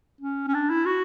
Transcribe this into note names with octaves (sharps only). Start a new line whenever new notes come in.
C#4
C#4
D4
E4
F#4